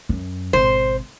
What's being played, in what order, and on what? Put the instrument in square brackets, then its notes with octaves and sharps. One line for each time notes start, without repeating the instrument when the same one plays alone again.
[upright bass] F#2
[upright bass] G#1 B2 [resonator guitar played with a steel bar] C5